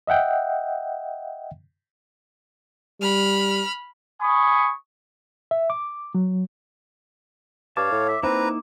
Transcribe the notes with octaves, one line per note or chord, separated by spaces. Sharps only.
D#5 E5 F#5 G5
G3 B5 F6
G#5 B5 C#6 D#6
E5
D6
F#3
G2 C#5 F5 A5 D6
A2
E5
A#3 C4 D#4 E4 B4 A#5